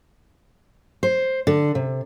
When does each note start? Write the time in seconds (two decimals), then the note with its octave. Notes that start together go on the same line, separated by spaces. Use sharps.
1.03 C5
1.47 D3
1.75 C3